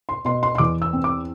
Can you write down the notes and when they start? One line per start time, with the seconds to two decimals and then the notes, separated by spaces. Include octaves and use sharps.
0.09 C6
0.25 B2 C6
0.43 C6
0.55 C6
0.58 E2 D6
0.82 E6
0.93 C4
1.04 D6